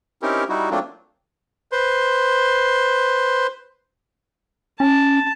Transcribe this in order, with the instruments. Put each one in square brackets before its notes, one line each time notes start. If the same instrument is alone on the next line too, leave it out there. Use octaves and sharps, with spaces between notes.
[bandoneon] C4 C#4 D#4 E4 G4 A#4
G3 D#4 E4 F#4
F#3 A3 A#3 C4 D4 F4
B4 C5 C6
[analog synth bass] C#4 [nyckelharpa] A5